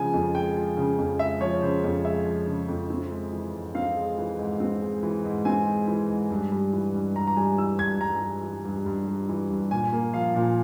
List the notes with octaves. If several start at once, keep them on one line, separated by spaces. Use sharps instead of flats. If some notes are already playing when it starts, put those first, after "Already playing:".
Already playing: C#3 F3 G#3 G#5
F2
G#3 G5
F3
C#3
F2
G#3 E5
F3 C#5
C#3 C5
F2
G#3 E5
F3
C#3
F2
C4
G#3
E3
G#2
C4 F5
G#3
E3
G#2
C4
G#3
E3
G#2
C4 G#5
G#3
E3
G#2
G2
G3
E3
G2
G2 A#5
A#5
G3 G#5
E3 E6
G2 G#6
G2 A#5
G3
E3
G2
G2
G3
E3
G2
A#2 G#5
A#3
F3 F5
A#2